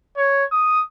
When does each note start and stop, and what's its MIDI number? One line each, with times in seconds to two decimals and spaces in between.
0.17 0.44 73
0.52 0.82 87